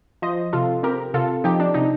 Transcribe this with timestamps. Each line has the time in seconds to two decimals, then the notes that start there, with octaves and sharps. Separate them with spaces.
0.22 F3 C5 D#5
0.53 C3 F4 A4
0.83 C4 G4 A#4
1.14 C3 F4 A4
1.44 F3 D#4 G4
1.60 D4
1.74 C3 D#4